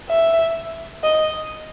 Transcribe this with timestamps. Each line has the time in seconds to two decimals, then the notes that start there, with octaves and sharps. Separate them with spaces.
0.09 E5
1.03 D#5